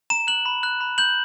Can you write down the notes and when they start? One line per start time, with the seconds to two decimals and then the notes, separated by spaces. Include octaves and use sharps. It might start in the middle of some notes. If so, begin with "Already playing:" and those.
0.10 A#5 E7
0.27 F#6 F#7
0.46 B5
0.63 F#6
0.81 B5
0.98 G6 F#7